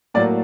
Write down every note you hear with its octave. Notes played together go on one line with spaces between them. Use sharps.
A2 F#3 A#3 D5